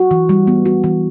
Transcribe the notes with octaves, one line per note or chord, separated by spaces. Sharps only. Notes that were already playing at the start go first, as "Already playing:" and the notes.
Already playing: F#4
E3
G3
B3
F#4
E3